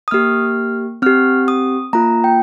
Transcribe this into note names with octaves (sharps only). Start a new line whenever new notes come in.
D#6
A#3 G4 F6
C4 G4 F6
D#6
A#3 F4 A#5
G5